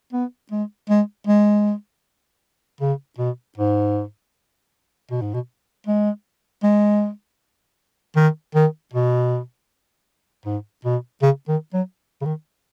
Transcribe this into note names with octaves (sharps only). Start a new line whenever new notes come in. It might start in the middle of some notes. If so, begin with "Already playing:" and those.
B3
G#3
G#3
G#3
C#3
B2
G#2
B2
G#2
B2
G#3
G#3
D#3
D#3
B2
G#2
B2
C#3
D#3
F#3
C#3
D#3